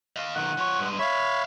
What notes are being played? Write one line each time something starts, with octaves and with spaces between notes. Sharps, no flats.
D#5 F5
B1 D#3 F#5
F3 C#5
G2 G#3
C#5 E5 F5 B5